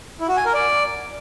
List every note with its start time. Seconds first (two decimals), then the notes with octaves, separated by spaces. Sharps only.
0.20 E4
0.28 F#4
0.37 G#5
0.45 A#4
0.54 D5